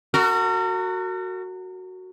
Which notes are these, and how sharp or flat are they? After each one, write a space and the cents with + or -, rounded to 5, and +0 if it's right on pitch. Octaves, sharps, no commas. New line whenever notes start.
F#4 +0 A#4 -40